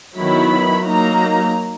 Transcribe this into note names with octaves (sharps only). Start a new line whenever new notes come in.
D#3 F#3 B3 E4 B5
F#3 A#3 D#4 A#5